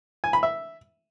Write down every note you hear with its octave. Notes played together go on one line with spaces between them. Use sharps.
G#5
B5
E5